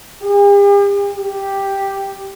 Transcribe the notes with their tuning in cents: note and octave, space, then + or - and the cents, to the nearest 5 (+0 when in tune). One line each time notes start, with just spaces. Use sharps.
G4 +45
G4 +0